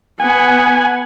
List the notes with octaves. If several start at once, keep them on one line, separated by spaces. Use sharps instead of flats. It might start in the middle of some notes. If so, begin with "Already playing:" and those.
B3 F#5 G#5